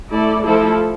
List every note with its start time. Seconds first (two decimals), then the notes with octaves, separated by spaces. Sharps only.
0.09 A3 E4 A4 D5
0.43 F3 A3 E4 A4